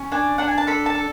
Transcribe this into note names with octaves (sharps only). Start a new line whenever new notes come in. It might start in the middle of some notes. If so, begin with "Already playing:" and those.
Already playing: C#4
D4 G#5
D4 F#5
G#5
A5
A4 B5
A5
A4